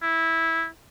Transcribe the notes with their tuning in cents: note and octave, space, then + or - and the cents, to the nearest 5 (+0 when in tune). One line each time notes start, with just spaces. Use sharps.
E4 -10